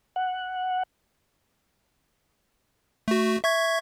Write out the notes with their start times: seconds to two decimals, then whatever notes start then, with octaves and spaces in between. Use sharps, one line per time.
0.16 F#5
3.08 A3 F#4
3.44 E5 C#6 G#6